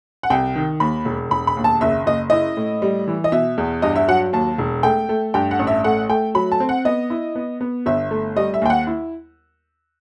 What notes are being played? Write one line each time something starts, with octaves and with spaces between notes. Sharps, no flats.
F#5
C2 G5
D#3
D#2 B5
E1
E1 B5
B5
D#2
A5
F#1 E5
F#1 D#5
E4 D#5
A2
G3
E3
D#5
B2 E5
E2
G2 D#5
E5
F#3 F#5
D#2 A5
E1
A3 G5
A3
G2 G5
F#5
A1
E5
A3 F#5
A3 G5
F#3 B5
A5
C4
F#5
B3 D#5
E4
B3
B3
G1 E5
A3
G3 D#5
E5
D#2 G5
F#5
E4